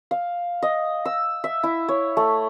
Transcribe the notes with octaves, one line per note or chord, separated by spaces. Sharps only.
F5
D#5
E6
E5
E4
C#5
A3